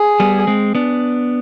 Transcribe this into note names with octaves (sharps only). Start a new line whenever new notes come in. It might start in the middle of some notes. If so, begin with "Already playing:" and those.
Already playing: G#4
G3 B3
G#3 C4
B3 D4